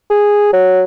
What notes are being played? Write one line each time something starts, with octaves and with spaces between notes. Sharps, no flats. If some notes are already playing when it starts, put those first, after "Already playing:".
G#4
F#3